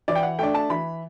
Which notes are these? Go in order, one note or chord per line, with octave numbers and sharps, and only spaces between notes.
E3 D5
G5
F#5
A3 D4 G5
A5
E3 B5